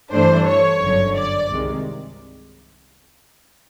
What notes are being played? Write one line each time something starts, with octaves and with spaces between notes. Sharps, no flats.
G2 E3 A3 D4 C5
C#5
G1 F#2 D3
D5
C2 C3 D#3 G#3